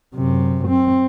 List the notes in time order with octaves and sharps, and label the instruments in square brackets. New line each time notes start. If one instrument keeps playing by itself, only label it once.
[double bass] F#2 C3
C4